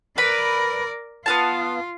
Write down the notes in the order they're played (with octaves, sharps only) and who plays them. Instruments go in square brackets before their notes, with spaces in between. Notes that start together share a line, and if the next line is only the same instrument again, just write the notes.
[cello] A#4 D5 [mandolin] B4 B5
[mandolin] B3 F5 A5 [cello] F4